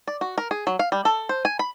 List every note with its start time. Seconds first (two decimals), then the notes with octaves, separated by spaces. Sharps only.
0.08 D5
0.21 F#4
0.38 A#4
0.51 G#4
0.67 F#3
0.79 F5
0.92 G3
1.05 A4
1.29 C5
1.45 G#5
1.59 B5